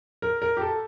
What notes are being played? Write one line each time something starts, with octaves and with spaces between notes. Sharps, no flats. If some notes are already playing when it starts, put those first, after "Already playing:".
A#4
A#4
G4
A4